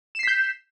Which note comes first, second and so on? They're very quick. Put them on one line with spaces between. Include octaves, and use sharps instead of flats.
E7 C7 B6 G6